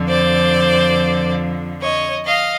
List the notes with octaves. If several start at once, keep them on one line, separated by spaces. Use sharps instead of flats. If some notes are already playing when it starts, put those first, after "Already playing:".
Already playing: F2 D3 F3
C5 D5
C#5 D#5
D#5 F5